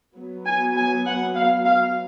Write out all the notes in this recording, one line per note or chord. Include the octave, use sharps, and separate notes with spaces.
F#3 B3
G#5
G#5
F#5
F5
F5